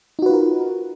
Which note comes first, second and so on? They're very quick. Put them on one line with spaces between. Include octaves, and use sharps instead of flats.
D#4 F#4 B4 F4 A#4